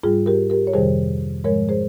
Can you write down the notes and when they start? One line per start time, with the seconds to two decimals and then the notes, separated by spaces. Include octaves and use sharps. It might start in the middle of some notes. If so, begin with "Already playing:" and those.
0.03 G#2 G3 F4 G#4
0.26 G4 A#4
0.50 G4 A#4
0.67 C#5
0.74 F2 C3 D#3 G3 G#4 C5
1.44 G#2 F3 G#3 A#4 C#5
1.69 G#4 C5